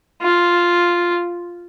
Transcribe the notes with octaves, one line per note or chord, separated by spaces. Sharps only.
F4